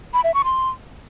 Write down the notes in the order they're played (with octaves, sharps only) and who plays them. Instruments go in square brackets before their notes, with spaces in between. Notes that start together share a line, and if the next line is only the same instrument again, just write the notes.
[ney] B5
E5
C#6
C6